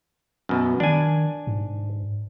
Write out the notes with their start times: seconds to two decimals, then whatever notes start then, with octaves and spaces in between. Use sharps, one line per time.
0.49 F#2 B2
0.80 D#3 D4 G#5
1.47 G#2